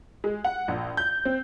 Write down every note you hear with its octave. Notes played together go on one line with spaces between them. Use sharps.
G#3
F#5
A#1
G6
C4